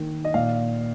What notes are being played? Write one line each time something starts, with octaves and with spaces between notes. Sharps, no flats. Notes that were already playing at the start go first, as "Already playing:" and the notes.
Already playing: D#3 A#3
D#5
A#2 F5